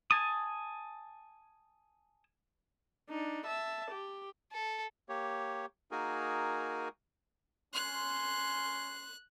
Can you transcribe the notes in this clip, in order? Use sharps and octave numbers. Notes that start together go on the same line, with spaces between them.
G#5 A5 D#6
D4 D#4
E5 A5
G4
A4
A#3 G4 C#5
A#3 D#4 F#4 G#4 A#4 G#5
C#4 C6 F#6